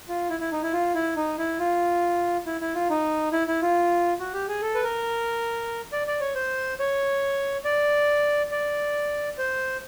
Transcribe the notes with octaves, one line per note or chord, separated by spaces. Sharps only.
F4
E4
E4
D#4
E4
F4
E4
D#4
E4
F4
E4
E4
F4
D#4
E4
E4
F4
F#4
G4
G#4
A4
B4
A#4
D5
D5
C#5
C5
C#5
D5
D5
C5